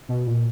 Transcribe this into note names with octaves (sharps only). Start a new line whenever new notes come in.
B2
A#2